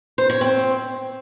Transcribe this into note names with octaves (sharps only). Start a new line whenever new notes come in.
C5
C#5
C4